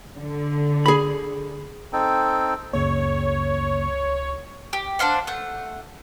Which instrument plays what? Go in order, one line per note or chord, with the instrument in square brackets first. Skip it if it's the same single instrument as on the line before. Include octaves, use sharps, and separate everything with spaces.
[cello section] D3
[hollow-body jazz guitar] G#4 B5
[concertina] C4 D#4 A4 G5
[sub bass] C#2 [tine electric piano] F#2 C#3 A#3 [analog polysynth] C#5
[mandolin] G4
D4 C5 F5 F#5
A3 F#5